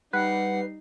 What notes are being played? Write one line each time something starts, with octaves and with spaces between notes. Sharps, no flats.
G3 D#4 B4 F#5 C7